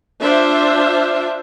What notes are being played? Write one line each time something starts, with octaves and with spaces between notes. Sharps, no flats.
D4 F4 C5 E5